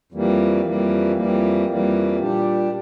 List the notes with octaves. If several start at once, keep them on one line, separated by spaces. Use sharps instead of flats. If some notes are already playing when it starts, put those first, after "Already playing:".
F2 E3 G3 A#3
F2 E3 G3 A#3
F2 E3 G3 A#3
F2 E3 G3 A#3
A#2 G3 D4 G4